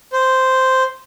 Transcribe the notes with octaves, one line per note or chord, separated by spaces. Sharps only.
C5